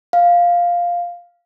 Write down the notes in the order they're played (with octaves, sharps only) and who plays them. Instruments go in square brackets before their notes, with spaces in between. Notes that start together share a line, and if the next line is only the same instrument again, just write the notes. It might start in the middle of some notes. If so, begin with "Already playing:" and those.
[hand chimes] F5